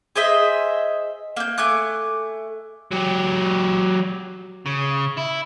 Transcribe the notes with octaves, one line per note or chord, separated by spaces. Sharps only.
G#4 C5 D#5 E5
A#3 G6
A3 G#5 D6 F#6
F#3 G4
C#3
E4